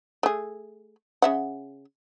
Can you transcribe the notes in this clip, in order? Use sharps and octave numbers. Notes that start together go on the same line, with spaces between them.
A3 G#4
C#3 E5 F#5